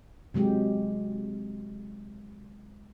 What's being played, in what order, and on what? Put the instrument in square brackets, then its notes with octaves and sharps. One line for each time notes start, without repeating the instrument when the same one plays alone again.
[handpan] C3 F#3 G#3 G4